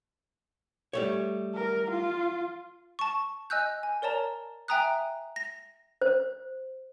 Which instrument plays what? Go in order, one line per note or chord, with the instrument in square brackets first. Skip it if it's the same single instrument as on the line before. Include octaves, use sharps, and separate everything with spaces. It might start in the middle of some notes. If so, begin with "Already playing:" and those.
[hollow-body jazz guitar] G3 A3 C#5
[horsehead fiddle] A#4
F4
[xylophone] A5 C#6
D#5 G#5 E6 F#6 G6
G#5
A#4 C#5 D5 A5 A#5
E5 G5 G#5 A#5 D#6 F#6
A#6
[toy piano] C5